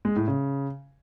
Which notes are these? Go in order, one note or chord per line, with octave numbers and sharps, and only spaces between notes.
G#3
A2
C#3